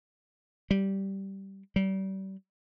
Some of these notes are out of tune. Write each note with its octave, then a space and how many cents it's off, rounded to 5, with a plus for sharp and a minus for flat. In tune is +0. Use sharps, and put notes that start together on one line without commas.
G3 -10
G3 -35